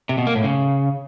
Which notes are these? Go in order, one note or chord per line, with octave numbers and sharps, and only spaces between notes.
C3
B2
A#3
A2
C#3